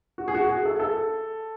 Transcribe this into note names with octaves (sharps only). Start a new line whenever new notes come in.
F#4
G#4
F#4
G#4
A4
A4